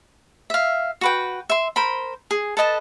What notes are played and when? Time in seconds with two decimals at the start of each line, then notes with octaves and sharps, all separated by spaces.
0.50 E5 F5
1.01 F#4 B4 G5
1.49 E5 C6
1.76 A#4 C5 B5
2.31 G#4
2.57 A4 B4 D#5 A5